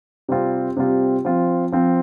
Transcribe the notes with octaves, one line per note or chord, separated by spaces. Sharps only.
C3 G3 C4 F4
C3 G3 C4 F4
F3 C4 F4
F3 C4 F4